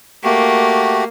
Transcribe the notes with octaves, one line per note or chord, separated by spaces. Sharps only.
A3 A#3 F#4 G4